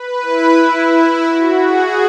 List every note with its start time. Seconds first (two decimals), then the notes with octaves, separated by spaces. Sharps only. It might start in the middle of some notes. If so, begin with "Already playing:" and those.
Already playing: B4
0.22 E4
0.92 E4
1.27 F#4
1.62 G#4